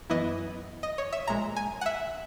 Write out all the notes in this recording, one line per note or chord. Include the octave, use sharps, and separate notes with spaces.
F#2 E3 B3 E4 D#5
D#5
C#5
E5
A#1 A#2 G#3 A#5
G#5
F#5
E5